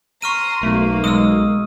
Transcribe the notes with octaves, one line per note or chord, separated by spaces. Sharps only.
A#5 C6 C#6 F6 D#7
B1 A3 A#3
G#3 D#6 E6